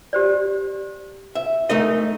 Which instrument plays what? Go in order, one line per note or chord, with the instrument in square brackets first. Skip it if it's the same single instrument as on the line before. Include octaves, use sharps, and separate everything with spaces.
[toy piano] G4 C5 D5
[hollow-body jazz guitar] E5
[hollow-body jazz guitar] A3 D#4 D#5 [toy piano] A#4 E5